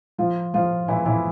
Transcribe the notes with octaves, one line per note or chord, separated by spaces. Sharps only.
F3 F4
F3 F4
E3 E4
E3 E4